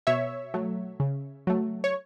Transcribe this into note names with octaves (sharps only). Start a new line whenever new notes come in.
B2 C#5 E5
F#3 A3
C#3
F#3 A3
C#5